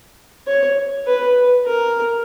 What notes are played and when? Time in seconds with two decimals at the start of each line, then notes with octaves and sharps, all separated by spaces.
0.47 C#5
1.07 B4
1.65 A#4